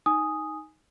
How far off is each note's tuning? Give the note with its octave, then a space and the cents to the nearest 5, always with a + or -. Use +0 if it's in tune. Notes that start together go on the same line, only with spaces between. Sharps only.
D#4 +5 G#5 +0 D#6 +0